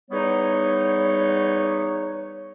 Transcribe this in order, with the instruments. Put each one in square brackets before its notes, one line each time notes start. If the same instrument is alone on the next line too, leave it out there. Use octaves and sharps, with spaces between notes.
[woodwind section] E2 G3 B3 D#4 C#5